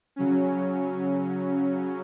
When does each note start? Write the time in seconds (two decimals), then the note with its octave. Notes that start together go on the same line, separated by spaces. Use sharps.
0.16 C#3 F#3 C#4